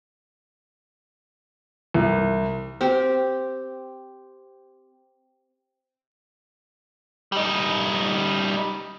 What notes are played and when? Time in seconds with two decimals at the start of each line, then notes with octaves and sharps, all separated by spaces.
1.94 C2
2.81 C4 G4
7.32 G3 D#4